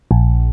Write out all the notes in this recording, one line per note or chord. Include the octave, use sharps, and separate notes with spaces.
A#1